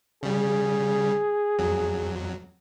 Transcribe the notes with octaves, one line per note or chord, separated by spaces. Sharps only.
C#3 G3 G#4
F2 F#3